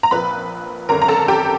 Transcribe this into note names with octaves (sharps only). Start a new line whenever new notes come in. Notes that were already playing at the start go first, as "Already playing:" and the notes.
A#5
A#1 A#2 F3 B4 B5
G#1 F#2 D3 A#4 A#5
A#5
A4 A5
G4 G5